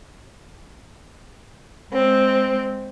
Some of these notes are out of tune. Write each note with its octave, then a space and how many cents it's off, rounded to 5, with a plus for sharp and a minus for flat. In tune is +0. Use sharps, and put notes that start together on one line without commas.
G#3 +0 C4 +0